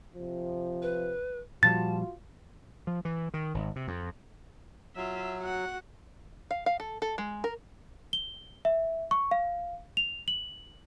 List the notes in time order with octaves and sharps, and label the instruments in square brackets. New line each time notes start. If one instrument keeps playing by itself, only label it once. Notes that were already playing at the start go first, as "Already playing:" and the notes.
[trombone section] C3 F3
[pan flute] B4
[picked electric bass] A#2 F3 G3 [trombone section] F4 F#4 [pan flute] A5 [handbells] A6
[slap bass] F3
E3
D#3
G#1
C3
F2
[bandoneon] F#3 [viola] F4 E5
[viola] F#4 F#5
[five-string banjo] F5
F5
A4
A4
G#3
A#4
[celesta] G7
E5
C#6
F5
F7
F#7